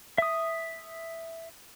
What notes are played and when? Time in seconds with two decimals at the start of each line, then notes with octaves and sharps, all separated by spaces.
0.18 E5 D#6